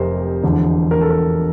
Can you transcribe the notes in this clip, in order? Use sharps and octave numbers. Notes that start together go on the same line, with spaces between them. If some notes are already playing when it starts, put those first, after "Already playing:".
Already playing: F1 F2 C3 A#4 C5
E1 E2 D3 F3
A#4
A4
A#4